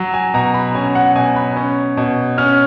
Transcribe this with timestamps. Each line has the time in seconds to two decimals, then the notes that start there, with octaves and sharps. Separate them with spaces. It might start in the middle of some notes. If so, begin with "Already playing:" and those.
Already playing: F#3
0.14 G#5
0.34 B2 A#5
0.54 B5
0.75 C#4 G#5
0.95 F#5
1.16 B2 G#5
1.36 B5
1.57 C#4
1.97 B2
2.38 C#4 F6